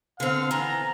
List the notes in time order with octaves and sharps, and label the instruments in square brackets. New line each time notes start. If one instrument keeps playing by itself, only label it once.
[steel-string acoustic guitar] D3 C4 [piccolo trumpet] F5
[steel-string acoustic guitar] E3 B3 [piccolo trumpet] A#5